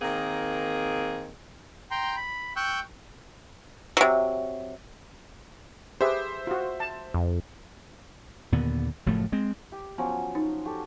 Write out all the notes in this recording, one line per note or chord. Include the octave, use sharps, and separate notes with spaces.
D#3 A#3 C4 G#4
G5 A#5 C6
B5
G5 C#6 E6 F#6 G6
C3 F#3
G4 G#4 B4 C5 E5
F4 F#4
A5
F2
D#2 A#2 D3 B3
F#1 A2 F3 A3
G#3 C4
G4
F3 F#3 B3 C#4
D#4
F#4 G4 A4